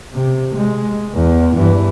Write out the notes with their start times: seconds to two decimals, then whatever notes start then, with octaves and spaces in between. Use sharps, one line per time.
0.14 C3
0.56 G#3
1.16 E2
1.56 G2 E3